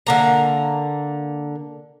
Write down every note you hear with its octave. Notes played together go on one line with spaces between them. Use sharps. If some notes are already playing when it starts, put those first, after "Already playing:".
D3 A#3 A#5